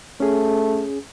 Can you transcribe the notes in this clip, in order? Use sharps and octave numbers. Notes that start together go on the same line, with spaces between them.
A3 C#4 G#4